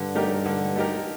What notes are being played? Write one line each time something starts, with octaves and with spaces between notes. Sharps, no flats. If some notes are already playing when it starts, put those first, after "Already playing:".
Already playing: G2 D3
A3 D#4 G4 A#4
D3
A3 D#4 G4 A#4